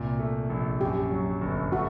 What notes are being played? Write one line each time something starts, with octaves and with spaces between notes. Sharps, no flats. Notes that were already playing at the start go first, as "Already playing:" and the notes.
Already playing: C2 A#2
A3
A#1
F#2 G4
F#3
G1
A3 F#4